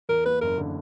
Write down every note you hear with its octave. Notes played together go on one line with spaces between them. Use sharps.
E2 A#4
A#3 B4
F#1 A#4
D3